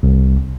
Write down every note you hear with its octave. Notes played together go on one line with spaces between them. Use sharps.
C2